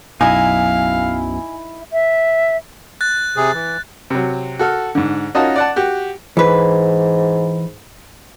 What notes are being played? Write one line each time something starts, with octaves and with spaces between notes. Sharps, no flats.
B1 F#2 B2 D#4 E4 F5 G#5
E5
F#6 A6
C3 G#4
E3
C3 F#3
F#4 A4 F6
G#2 D3
C#4 D#4 F4 F#4 D#5 A5
D5 F#5 A5
F#4 G4
G#2 E3 B4